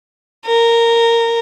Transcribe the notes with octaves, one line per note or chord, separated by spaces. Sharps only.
A#4